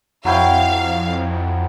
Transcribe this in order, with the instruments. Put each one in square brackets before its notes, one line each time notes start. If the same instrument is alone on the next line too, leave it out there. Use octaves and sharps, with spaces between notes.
[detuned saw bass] F2 [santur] F#3 E4 G5 [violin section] F5